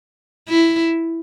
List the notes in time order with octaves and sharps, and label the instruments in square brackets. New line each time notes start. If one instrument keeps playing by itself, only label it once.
[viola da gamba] E4